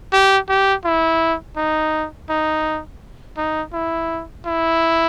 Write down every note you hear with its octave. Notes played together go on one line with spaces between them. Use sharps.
G4
G4
E4
D#4
D#4
D#4
E4
E4